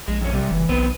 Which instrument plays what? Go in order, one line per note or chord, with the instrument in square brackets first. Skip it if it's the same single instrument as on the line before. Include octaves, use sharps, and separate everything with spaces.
[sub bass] A#1 [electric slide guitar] G#3
[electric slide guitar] F2 C#4
C3 G3
[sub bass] F#1 [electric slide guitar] E3
[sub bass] B1 [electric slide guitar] B3 C4 B4